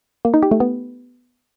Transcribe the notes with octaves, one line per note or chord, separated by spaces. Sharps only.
A#3
D#4
G4
A3
B3